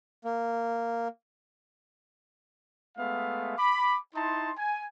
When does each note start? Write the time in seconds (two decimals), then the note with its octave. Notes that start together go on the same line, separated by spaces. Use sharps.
0.24 A#3
2.97 G#3 A3 B3 E5 F5
3.58 B5 D6
4.15 D#4 E4 A5 C6
4.58 G#5